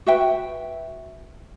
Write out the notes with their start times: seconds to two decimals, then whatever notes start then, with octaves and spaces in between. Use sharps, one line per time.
0.06 F#4 B4 E5 G5